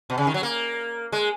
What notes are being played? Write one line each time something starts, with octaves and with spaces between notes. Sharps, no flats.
B2
C#3
D#3
F#3
A#3
G#3